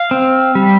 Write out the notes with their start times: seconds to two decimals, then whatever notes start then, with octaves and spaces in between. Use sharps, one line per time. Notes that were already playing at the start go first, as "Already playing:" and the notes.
Already playing: F5
0.11 C4
0.55 G3